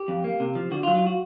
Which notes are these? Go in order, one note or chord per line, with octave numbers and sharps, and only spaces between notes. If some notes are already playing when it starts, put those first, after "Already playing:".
Already playing: G4
F2
A#3
C3
F3
D3 F#4
F4
F#3
F4
F#4